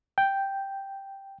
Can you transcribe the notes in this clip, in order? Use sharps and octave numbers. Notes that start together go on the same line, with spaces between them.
G5